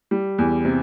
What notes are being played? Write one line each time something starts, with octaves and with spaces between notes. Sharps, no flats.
G3
E2
C3